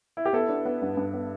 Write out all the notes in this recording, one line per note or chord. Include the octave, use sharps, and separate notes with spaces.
E4
G4
B3 E4 A4
D4
B3
G2
G2
B3